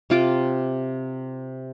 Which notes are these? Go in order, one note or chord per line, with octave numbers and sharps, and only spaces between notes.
C3 F4 D6